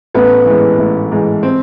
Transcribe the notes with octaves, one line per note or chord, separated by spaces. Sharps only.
A1 B3
G#2 E3
A1
G#2 E3
C4